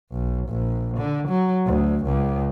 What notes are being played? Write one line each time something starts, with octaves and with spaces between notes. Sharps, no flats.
B1
A#1
D3
F#3
D2
C#2